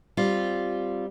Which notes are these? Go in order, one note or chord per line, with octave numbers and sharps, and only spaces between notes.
G3 C4 F4